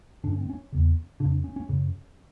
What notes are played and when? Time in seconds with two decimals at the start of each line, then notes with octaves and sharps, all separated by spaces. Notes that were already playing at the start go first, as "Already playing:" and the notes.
0.24 G2 D3 D4
0.33 C#4
0.41 C4
0.50 C#4
0.72 E2 C#3
1.20 F2 C#3 D4
1.44 C#4
1.56 C#4
1.69 F#2 C#3